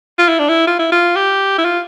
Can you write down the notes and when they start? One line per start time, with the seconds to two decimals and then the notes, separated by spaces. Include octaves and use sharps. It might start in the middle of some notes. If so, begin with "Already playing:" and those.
0.19 F4
0.29 E4
0.39 D4
0.49 E4
0.67 F4
0.79 E4
0.92 F4
1.16 G4
1.58 E4
1.65 F4